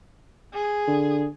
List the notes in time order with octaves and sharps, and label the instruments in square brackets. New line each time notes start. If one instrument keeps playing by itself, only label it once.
[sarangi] G#4
[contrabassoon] D3